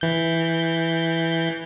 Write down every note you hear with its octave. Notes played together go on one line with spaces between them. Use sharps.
E3 G6